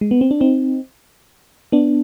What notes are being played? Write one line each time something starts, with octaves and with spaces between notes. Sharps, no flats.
G#3
B3
C4
D4
C4 D#4
B3 D4